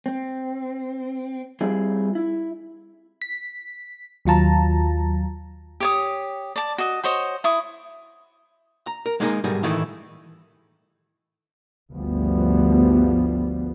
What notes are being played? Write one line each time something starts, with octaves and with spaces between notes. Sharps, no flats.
C4
G3 C4 E4 F4 G#4
E4
B6
D#2 F#3 F4 A5 A#5
G4 C#5 D#6
D5 A5
F#4 D#5
F#4 C5 C#5 D#5
E4 C#6 D#6
A#5
A#4
G#3 A#3 D#4 E4 G#4 A#4
B1 G#2 G3 A3 G#4 A#4
A2 D#3 E3 A3 D#4 E4
G1 D2 G2 F3 G3 B3